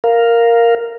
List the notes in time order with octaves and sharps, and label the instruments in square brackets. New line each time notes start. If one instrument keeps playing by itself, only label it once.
[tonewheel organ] A#4 F5